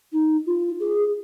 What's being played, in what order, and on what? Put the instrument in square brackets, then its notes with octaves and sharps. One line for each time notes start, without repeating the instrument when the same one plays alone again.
[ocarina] D#4
F4
G#4